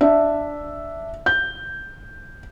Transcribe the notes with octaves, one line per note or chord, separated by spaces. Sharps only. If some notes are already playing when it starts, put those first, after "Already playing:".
D4 E5
G6